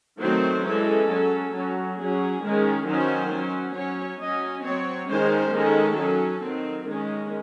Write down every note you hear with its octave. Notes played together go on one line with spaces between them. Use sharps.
D#3 F#3 A3 C4 C5
E3 G#3 C#4 A4
F#3 C#4
F#3 C#4
F#3 C#4 G#4
D#3 G#3 C#4
D#3 F#3 C#4 C5
F#3 C#4
F#3 C#4 C#5
F#3 C#4 D#5
F#3 C4 C#5
D#3 G#3 C#4 C5
D#3 G#3 C#4 A4
F#3 C#4
D#3 F#3 C4
D#3 G#3 C#4